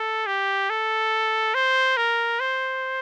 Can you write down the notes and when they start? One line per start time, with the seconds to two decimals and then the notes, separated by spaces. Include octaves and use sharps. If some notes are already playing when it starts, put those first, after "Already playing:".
Already playing: A4
0.27 G4
0.70 A4
1.55 C5
1.97 A#4
2.40 C5